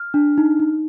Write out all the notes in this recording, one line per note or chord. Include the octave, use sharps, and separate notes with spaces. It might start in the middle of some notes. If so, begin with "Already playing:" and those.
Already playing: F6
D4
D#4
D#4